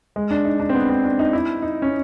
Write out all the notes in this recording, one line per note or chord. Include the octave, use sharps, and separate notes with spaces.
G#3
D4
D#4
D4
C4
B3
C4
D4
D#4
E4
D#4
C#4